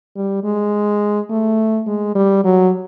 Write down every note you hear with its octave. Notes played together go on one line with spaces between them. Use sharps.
G3
G#3
A3
G#3
G3
F#3